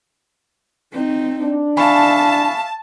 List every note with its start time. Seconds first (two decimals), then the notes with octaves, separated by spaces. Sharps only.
0.92 C4 D#4
1.40 D4
1.77 E5 F5 G#5 A5 B5 C#6